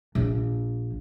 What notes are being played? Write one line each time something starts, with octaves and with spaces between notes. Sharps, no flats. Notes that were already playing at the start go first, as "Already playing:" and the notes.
A#1